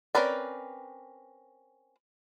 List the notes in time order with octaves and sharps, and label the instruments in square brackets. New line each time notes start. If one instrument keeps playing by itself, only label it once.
[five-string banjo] C4 C#4 A#4 B4 D5